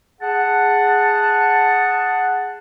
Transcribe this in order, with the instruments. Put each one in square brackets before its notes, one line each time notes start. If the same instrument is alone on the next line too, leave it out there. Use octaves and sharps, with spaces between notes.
[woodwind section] G#4 F#5 A5